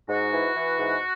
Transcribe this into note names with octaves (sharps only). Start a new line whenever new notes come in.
G#2 F#4
E3
E3
G#2